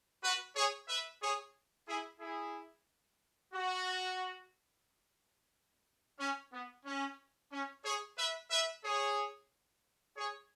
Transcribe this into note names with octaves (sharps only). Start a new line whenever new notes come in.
F#4 B4
G#4 C#5
B4 E5
G#4 C#5
E4 G#4
E4 G#4
F#4
C#4
B3
C#4
C#4
G#4 C#5
B4 E5
B4 E5
G#4 C#5
G#4 C#5